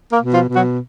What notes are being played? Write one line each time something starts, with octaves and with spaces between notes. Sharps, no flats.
A#3 A#4
B2
F3 F4
B2
F#3 F#4